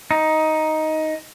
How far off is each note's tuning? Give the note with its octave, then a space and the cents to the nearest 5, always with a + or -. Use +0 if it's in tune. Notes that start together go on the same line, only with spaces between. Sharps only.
D#4 +10